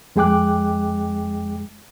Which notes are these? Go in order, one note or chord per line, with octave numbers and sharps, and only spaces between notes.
F2 G#3 G#4 G5 D6 F#6